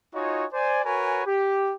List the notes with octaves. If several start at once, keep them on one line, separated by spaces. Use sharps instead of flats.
D#4 F4 F#4 C#5 D#5 G#5
C5 D5 G#5
F#4 A#4 B4 C#5 G#5
G4